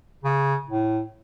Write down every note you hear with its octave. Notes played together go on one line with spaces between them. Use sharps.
C#3
A2